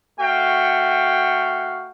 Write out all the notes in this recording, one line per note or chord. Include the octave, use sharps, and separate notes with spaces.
A3 F#4 F5 G5